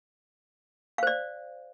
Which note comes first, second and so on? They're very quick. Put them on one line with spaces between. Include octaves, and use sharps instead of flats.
F5 C5 D5